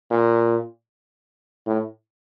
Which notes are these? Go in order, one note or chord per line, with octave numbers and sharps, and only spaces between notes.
A#2
A2